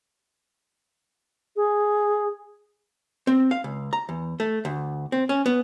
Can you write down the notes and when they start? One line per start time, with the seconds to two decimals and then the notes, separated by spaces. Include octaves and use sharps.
1.56 G#4
3.27 C4
3.51 F5
3.64 C#2
3.93 A#5
4.09 E2
4.40 A3
4.65 D2
5.12 C4
5.29 C#4
5.46 B3